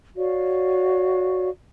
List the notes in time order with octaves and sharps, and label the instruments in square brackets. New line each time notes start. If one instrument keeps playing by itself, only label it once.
[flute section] F#4 C#5 D5 F5